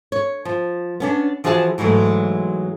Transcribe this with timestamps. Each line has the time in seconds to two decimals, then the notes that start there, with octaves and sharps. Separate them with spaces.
0.12 C#5
0.45 F3
1.00 B3 C#4 D4
1.44 E3 F3 F#4 G#4 F5 A5
1.78 G#2 E3 F#3 G#3 A3